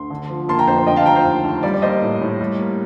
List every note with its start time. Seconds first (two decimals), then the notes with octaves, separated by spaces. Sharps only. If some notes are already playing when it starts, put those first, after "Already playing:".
Already playing: D2 C6
0.10 D3
0.29 F3
0.48 A#3 A5 C6
0.59 G5 A#5
0.67 F2 C5
0.78 C5
0.87 D3 D#5 G5
0.96 F5 A5
1.06 F3 G5 A#5
1.16 C5
1.25 D#2
1.44 D#2
1.63 G3 D5
1.74 D5
1.82 A#3 C5 D#5
2.02 A2
2.21 A2
2.41 G3
2.59 A#3